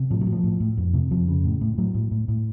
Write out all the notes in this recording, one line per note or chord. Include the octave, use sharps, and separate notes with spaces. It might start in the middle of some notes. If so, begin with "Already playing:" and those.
Already playing: C3
A2 F3
F#3
A2
F3
A2
A2
F2
C3
F2 F3
C#3
A2
A2
A2 F#3
A2
A2
A2